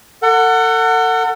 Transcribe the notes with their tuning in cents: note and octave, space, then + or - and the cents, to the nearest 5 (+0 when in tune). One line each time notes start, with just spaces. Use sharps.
A4 +40 F#5 +0